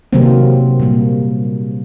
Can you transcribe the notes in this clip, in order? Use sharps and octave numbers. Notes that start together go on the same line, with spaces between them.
C3 D#3 F#3 A#3 C4
A#2 G3 A#3